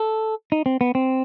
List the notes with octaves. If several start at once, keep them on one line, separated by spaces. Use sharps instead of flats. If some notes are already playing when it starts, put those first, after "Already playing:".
Already playing: A4
D#4
C4
B3
C4